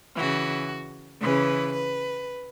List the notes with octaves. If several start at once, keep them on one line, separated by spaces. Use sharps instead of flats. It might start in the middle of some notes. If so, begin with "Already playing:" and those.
C#3 E3 F#4
C#3 E3 B4
B4